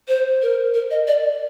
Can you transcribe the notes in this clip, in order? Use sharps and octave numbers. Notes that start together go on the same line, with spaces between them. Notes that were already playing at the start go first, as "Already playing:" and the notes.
C5
A#4
A#4
D#5
D5